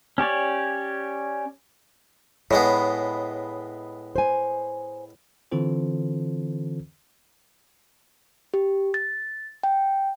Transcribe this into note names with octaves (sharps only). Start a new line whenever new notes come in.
C#4 G4 C#5 D5
A2 G#3 B3 C#5
C5 G#5
D3 E3 C4 F4 A4 C5
G4
A6
G5